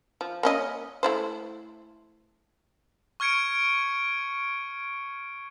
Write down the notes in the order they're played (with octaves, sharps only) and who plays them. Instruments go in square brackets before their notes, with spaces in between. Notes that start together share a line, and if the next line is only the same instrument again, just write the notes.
[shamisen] F3
A#3 C#4 D#5
A3 E4 C5
[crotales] C#6 F6 G#6 C#7 D7